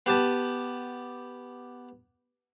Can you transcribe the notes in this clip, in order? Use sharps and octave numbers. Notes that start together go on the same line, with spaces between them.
B3 G4 B4 A5